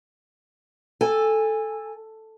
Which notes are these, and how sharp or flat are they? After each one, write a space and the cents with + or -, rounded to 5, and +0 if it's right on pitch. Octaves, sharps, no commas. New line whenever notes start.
A4 +0 G#5 -15